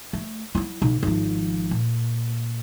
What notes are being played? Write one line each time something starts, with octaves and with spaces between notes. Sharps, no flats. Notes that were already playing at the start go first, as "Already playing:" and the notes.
A3
F#3 E4
B1
G#1 F3
A#2